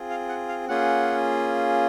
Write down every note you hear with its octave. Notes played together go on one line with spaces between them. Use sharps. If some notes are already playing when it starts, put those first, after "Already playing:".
Already playing: C4 F4 G#4
F5
F#5
F5
A#3 C#4 F4 G#4 F#5